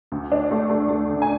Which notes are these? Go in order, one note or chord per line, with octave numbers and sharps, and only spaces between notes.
D2
D4
A3
A3
A3
D2
G#5